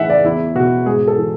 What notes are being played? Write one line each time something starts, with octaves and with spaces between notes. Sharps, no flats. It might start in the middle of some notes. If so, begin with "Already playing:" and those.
Already playing: A2 E3 E5 F#5
D5
E2 E4
B2 F#4
G#2 G#4
A4
E3